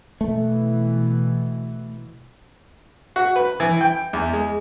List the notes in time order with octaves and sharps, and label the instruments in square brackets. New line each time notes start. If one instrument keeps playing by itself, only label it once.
[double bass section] B2 E3 [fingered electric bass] A3
[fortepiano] F#4
B4
E3
G5
E2
G#3